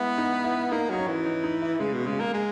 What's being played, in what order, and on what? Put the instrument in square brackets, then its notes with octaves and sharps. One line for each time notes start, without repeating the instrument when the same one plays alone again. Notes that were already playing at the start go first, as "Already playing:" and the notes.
Already playing: [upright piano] G#3 E4 [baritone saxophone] B3
[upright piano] D#4
E4
[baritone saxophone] A#3 [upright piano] D#4
[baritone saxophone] F#3 [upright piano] D#4
[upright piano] C#4
[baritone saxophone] E3
[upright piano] D#4
D#4
E4
[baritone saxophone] C#3 [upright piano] G#3
[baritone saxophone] B2
[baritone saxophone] C#3 [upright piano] G#3
[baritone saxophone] A#3
G#3